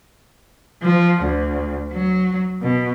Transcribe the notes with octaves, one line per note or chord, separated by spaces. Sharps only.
F3
D2
F#3
B2